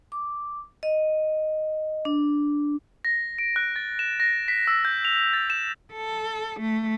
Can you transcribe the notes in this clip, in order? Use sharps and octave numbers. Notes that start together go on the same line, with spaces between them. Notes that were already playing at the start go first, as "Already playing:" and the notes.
D6
D#5
D4
A#6
D7
F#6
A6
E7
A#6
B6
E6
G6
F7
A6
E7
A4
A3